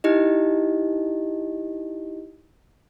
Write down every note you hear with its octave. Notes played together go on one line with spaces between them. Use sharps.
D#4 E4 G4 D#5